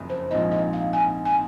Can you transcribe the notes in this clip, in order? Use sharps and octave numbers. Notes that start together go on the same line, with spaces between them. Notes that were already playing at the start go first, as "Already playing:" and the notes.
Already playing: F#1 F2 C#3
C5
A#1 G#2 F3 C4 D#4 D#5
D#5
F5
G#5
G#5